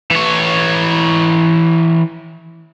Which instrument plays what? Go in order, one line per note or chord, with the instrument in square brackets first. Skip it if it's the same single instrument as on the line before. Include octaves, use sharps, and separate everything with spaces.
[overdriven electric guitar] E3 C#5